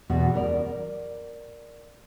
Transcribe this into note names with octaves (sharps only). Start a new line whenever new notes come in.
E2 B2 F#4
A#4 D5